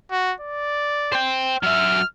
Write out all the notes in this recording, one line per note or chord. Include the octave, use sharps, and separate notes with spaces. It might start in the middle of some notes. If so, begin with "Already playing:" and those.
F#4
D5
C5 G5
F#3 E5 F6